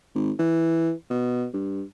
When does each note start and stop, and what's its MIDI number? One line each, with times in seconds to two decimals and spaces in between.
0.15 0.31 32
0.39 0.91 52
1.10 1.46 47
1.53 1.83 43